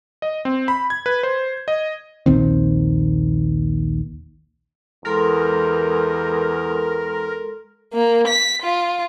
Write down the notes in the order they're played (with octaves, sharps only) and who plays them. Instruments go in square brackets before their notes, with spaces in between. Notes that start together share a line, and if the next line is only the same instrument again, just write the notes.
[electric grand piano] D#5
C4
B5
G#6
B4
C5
D#5
[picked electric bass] A#1 D#2 D#3 C4
[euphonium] E2 [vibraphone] G#3 A4 C6 [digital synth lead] A#4
[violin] A#3
B6
F4